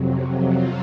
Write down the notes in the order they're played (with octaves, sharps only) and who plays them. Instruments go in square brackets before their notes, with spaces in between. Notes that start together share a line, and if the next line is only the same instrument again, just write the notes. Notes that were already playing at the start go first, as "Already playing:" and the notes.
Already playing: [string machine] F2 C3 F#3
F4